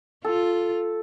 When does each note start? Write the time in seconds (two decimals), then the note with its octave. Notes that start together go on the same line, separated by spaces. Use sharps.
0.25 F4 A4